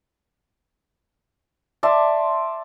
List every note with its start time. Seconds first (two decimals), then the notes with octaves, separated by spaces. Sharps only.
1.83 D5 E5 A5 C6